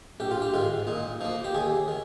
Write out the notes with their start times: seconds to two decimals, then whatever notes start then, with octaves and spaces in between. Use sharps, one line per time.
0.20 A#1 G4
0.31 F4
0.42 G4
0.54 G#2 D#3 F4
0.87 A#2 D#4
1.21 F3 A#3 D#4
1.44 G4
1.55 D#2 G#4
1.88 D#3